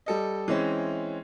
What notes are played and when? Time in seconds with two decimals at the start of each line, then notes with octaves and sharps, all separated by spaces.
0.06 G3 A4 D#5
0.48 E3 G#3 C4 C#4